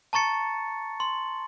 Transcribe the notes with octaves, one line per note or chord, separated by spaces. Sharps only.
A5 A#5 C#6 A6 C#7
C6